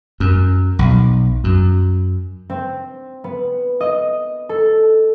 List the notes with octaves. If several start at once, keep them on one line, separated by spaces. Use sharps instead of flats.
F#2
B1
F#2
C4
B3
D#5
A4